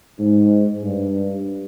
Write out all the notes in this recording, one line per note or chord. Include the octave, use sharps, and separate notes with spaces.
G#2
G2